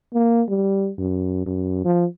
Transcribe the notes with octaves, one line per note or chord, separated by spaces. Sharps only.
A#3
G3
F#2
F#2
F3